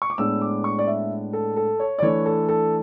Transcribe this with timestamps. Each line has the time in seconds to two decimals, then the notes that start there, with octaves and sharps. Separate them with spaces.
0.02 C#6
0.10 D6
0.18 A2 G#3 B3 D4 E6
0.42 D6
0.64 C#6
0.79 D5
0.87 E5
1.33 A4
1.56 A4
1.80 C#5
1.98 D5
2.02 E3 A3 D4 C#5
2.26 A4
2.49 A4